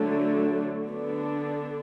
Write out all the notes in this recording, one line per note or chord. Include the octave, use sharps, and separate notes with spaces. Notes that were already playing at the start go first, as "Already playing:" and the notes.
Already playing: D3 F#3 A3 D4
D3 B3 D4